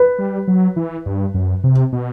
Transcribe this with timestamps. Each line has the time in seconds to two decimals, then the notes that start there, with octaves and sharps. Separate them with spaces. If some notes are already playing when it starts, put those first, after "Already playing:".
Already playing: B4
0.19 G3
0.48 F#3
0.76 E3
1.06 G2
1.34 F#2
1.64 C3
1.93 B2